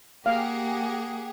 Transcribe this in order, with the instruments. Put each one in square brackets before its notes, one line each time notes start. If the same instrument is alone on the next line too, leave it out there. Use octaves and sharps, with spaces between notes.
[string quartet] A#3 F#5 [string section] G4 G#4 [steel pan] F5